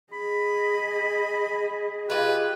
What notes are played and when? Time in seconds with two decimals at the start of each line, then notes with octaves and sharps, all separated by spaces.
0.13 G#4 D#5 B5
2.10 G#3 F4 G4 B4